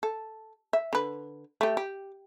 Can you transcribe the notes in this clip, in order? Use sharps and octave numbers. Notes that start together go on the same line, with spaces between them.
A4
E5
D3 B4
A3 G4
G4